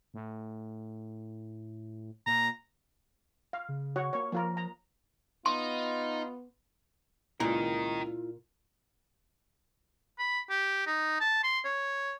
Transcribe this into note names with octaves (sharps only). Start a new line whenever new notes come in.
A2
A#2 A#5
F5
C#3
F#4 C#5 F#5
A#3 C#5
F3 A#3 F4 A#4
A#5
B3 D#4 F4 C6
C#2 A#2 E4 F4 A#4 D#5
B5
G4
D#4
A5
C6
C#5